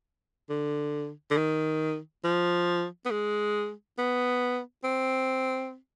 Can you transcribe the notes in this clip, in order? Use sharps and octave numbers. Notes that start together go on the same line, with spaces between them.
D3
D3
D#3
F3
B3
G#3
B3
C4